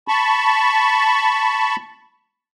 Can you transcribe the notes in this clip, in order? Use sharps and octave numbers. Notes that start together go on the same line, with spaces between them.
A5 B5 C#6